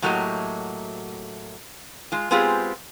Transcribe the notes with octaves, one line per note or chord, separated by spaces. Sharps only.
A2 F#3 A3 A#3 G4 D#5
G#3 F4
G#3 B3 C4 F4 G4 G#4